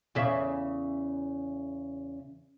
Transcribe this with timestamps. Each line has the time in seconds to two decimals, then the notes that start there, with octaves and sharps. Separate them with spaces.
0.15 E2 C#3 E5